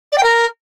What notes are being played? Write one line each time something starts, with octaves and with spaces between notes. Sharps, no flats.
D5
G5
A#4